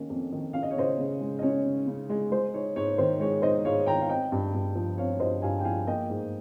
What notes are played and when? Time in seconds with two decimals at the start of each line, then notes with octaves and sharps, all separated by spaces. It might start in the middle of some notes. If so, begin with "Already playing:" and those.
Already playing: D#3 A#3 C#4
0.10 F2
0.32 D#3
0.53 C#4 F5
0.63 D#5
0.71 C#5
0.76 C#3 C5 D#5
0.99 C#3
1.21 G#3
1.39 D#5
1.42 C#4 C#5
1.66 C#3
1.87 C#3
2.09 G#3
2.31 G#3 C5
2.54 D#4 C#5
2.76 G#2 C#5
2.98 D#3 C5
3.20 G#3 C#5
3.42 D#4 C5 D#5
3.65 G#2 C#5 F5
3.86 D#3 G5 A#5
4.01 F5
4.09 C4 D#5 G5
4.32 G2
4.54 G2
4.75 F3
4.98 C4 C#5 F5
5.20 G2 C5 D#5
5.42 G2 F5 G#5
5.59 G5
5.64 F3 F5 G#5
5.87 A#3 D#5 G5
6.10 G#2